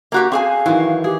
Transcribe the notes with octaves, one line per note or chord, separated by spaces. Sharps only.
A#3 F#4 G4
C4 G#4 F5 G#5
D#3 E3 F#3
G4 G#4